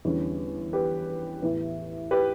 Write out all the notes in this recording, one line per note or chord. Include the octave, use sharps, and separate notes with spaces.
E2 D3 G3 C#4
G4 B4
A2 E3 B3
G4 B4